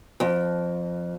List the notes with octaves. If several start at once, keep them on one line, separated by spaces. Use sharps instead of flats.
F2